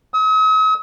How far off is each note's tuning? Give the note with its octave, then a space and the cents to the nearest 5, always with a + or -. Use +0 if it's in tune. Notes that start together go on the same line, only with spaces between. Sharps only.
D#6 +45